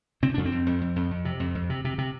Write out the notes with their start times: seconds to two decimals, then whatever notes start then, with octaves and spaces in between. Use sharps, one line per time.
0.23 C3 C4
0.34 F2 D4
0.45 C4
0.52 F2
0.67 F2
0.82 F2
0.96 F2
1.11 F2
1.25 C3
1.40 F2
1.55 F2
1.70 C3
1.85 C3
1.98 C3